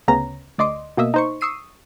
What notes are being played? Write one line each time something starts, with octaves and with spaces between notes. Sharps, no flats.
D2 C#3 B3 C#4 A#5
D2 D5 D#5 C6 D6
B2 A#3 D#5 E5
D#4 C5 C#6
C#6 D#6 E6 C7 D#7